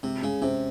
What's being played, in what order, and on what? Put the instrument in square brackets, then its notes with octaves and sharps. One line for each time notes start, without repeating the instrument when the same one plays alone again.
[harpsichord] C3 [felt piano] G#3
[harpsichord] C#3 [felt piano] G#3
[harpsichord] C3 [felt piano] C#4